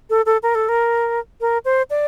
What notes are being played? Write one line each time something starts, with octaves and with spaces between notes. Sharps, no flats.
A4
A4
A#4
A4
A#4
A#4
C5
D5